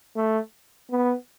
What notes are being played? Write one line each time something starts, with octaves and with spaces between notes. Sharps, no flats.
A3
B3